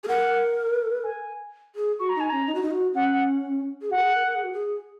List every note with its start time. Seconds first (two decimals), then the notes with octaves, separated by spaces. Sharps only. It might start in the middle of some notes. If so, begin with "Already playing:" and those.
0.04 G#4
0.08 A#4 F#5
1.03 G#5
1.76 G#4
1.99 F#4 C#6
2.09 A#5
2.15 D#4 G#5
2.29 C#4 A#5
2.47 D#4
2.55 F#4
2.63 D#4
2.71 F#4
2.94 C#4 F#5
3.82 G#4
3.90 F#4 F#5
3.97 A#4
4.02 G#4
4.15 A#4
4.26 A#4
4.35 G#4
4.44 F#4
4.53 G#4